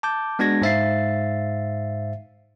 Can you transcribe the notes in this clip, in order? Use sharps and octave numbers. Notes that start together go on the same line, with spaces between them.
A5 D6 G6
G#3 B3 D4 F#4 G#6 A#6
G#2 C5 E5 F5 A6 C7